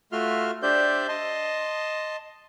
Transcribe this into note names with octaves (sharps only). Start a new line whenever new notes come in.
A3 F4 F#4 E5 C6 F6
D4 G4 C5 D5 E5 G6
D#5 A5 C6